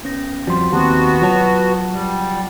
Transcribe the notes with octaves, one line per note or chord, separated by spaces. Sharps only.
B3 C#4 A#6
F2 F3 G3 F#4 C6
D#2 B3 C4 F#4 G4 A5
F#3 F4 C#5 F#5 A5
G3